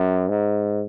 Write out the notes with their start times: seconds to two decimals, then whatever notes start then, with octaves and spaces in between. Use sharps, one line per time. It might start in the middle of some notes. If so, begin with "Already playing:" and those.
Already playing: F#2
0.29 G#2